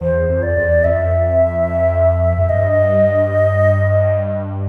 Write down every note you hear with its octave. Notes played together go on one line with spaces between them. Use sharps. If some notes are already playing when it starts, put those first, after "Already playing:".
E2 C5
F2
D5
E2
F2 E5
F#2
G2 D#5